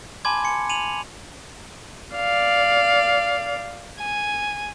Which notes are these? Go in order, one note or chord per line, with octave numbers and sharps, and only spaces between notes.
G#5 A5 B5 C6 D6 G#6
G#5 C6 C#7
G#5 D#7 F7 F#7
D5 F5
G#5